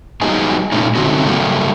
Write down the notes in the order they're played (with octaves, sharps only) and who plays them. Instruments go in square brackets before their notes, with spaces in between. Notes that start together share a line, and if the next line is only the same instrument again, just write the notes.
[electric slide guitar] F#3 G3 B3 D#4 G#4
A#2 A3 C#4 D#4
D3 A3 C4 C#4 D#4 F#4
C#3 F#3 G3 A3 A#3